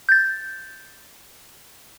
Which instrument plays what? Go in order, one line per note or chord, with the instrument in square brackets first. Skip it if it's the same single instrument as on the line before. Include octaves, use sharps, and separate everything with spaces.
[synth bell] G6 A6